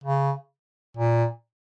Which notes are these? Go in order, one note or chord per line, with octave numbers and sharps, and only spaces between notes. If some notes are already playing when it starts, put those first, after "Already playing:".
C#3
A#2